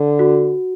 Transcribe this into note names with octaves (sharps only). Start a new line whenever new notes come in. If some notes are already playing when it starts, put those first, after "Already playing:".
Already playing: D3
F#4